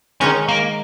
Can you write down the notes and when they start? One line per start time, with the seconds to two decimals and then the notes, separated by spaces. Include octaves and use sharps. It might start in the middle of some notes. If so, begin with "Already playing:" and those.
0.21 D#3 G#3 C#4 D#4 A#4 C#5
0.48 A#3